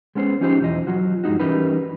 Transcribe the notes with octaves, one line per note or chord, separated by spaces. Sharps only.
G#3 B3 C#4 A#4 C5
F3 C#4 D#4 F4 G4 C5
B1 E2 E3 D#5
F#3 F4 F#4
G2 F3 G#3 D#4 F#4
E3 G3 C#4 D#4 A#4 B4